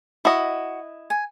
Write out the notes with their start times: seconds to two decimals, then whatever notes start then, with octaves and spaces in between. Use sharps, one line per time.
0.25 E4 F#4 D#5
1.10 G#5